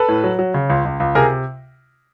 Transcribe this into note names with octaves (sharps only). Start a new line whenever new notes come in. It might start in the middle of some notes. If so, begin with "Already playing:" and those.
Already playing: A4 B4
A2
F#3
F#3
C#3
C#2
C#2
C#2
C3 G#4 A#4